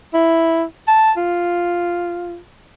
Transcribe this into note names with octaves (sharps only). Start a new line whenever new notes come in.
E4
A5
F4